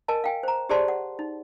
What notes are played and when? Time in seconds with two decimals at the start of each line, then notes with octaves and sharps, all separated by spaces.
0.08 A#4 D#5 G#5 A5
0.24 F5 G5 G#5
0.43 C5 A#5
0.69 G4 G#4 C5 D5 A5 C6
0.88 F#5
1.19 D#4